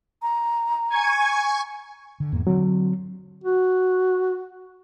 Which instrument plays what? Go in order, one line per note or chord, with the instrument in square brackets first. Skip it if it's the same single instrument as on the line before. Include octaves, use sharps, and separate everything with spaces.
[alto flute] A#5
[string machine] G#5 C#6 G#6
[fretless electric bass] D3
E2 G#2 A#3
[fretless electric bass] D3 C4 [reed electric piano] F#3
[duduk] F#4